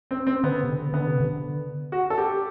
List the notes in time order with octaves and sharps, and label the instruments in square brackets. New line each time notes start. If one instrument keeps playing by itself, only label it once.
[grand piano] C4
C4
[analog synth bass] D3 [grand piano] B3
[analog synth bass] C3
D3
[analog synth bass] D3 [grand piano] B3
[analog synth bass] C3
D3
[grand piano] F#4
A4
G4